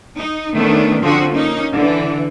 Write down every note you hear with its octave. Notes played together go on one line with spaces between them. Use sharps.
D#4
D#3 A3 B3 C#4 D4
D3 F3 C4 F#4
A#3 C#4 D#4
D3 E3